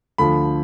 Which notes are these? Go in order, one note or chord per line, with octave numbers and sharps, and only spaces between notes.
D2 D3 F3 B5